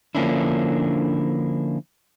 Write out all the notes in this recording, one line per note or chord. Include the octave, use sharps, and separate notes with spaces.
D3 F3 A#3 C#4 D4 E4